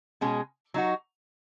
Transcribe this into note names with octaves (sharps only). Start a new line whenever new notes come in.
B2 G#3 C#4 G#4
F#3 D#4 F#4